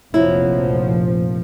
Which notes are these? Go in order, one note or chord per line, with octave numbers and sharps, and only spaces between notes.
F1 A#1 F3 F#3 E4